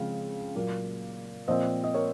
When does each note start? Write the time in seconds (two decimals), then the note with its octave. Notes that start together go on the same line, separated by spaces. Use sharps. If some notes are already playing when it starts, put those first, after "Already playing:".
Already playing: C#3 F3 G#3 C4 F5
0.55 A#2 F#3 A#3
1.48 A#2 F3 C4 C5 D#5
1.84 D#5
1.94 A#4 C#5